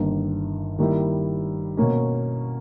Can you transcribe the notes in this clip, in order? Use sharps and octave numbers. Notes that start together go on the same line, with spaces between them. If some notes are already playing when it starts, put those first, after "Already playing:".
Already playing: G1 G2 D#3 A#3
D#3 G3 A#3 E4
B2 A#3 C#4